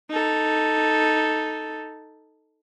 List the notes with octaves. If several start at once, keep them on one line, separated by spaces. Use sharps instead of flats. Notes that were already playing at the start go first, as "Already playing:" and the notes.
D#4 A4